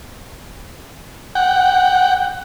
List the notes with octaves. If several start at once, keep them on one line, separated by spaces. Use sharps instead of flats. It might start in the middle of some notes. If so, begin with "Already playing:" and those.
F#5 G5